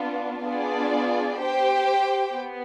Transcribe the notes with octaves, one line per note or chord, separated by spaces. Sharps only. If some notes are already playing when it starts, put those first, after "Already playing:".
Already playing: B3 D4 F4
B3 D4 F4 G#4 D5
G4 C5 G5
B3